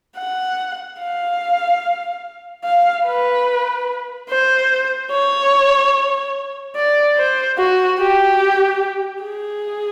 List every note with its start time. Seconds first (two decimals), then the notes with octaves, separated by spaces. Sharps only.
0.17 F#5
1.00 F5
2.64 F5
3.05 B4
4.29 C5
5.12 C#5
6.76 D5
7.17 C5
7.59 F#4
8.00 G4
9.23 G#4